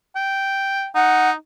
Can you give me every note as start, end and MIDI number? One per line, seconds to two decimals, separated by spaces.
0.16 0.87 79
0.95 1.34 63
0.95 1.30 78